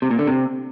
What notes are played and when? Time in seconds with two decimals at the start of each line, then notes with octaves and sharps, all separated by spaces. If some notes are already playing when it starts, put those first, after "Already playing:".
0.02 C3
0.11 A#2
0.19 D3
0.27 C3